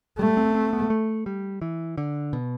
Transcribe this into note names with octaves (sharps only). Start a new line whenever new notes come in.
G3 A3
C4
C4
B3
A3
G3
E3
D3
B2